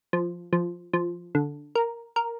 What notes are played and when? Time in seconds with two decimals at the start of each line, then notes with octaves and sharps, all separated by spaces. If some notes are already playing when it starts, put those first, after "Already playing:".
0.13 F3
0.53 F3
0.93 F3
1.35 D3
1.75 A#4
2.16 A#4